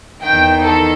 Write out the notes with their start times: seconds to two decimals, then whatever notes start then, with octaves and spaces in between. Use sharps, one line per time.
0.23 E2 D#3 G5
0.64 A4